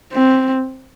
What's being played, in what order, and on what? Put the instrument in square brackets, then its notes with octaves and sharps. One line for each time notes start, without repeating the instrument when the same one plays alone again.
[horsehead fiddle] C4